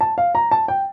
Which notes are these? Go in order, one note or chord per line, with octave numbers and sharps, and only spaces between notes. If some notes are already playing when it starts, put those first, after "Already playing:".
A5
F5
A#5
A5
G5